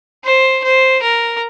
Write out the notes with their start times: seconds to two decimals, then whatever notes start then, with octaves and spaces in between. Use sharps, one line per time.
0.24 C5
0.64 C5
1.02 A#4